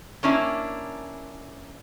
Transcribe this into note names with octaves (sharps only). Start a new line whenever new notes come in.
A#3 C#4 D4 E4